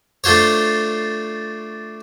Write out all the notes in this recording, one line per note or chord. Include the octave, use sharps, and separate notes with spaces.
A3 D4 F4 C5 C#5